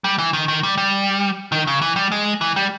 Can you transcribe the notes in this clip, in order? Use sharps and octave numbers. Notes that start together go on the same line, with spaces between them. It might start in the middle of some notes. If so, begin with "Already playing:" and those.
G3
E3
D#3
D#3
G3
G3
D#3
C#3
E3
G3
G#3
E3
G3